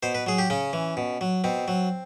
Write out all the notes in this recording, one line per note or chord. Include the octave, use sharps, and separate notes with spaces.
B2 C5
B4
F#3 G#4
G4
C#3 C#4
E3
B2
F#3
B2 C4
F#3